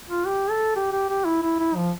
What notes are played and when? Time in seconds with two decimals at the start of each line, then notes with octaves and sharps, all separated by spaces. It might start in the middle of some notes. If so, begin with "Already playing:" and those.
0.09 F4
0.26 G4
0.50 A4
0.76 G4
0.92 G4
1.09 G4
1.25 E4
1.42 E4
1.60 E4
1.76 F3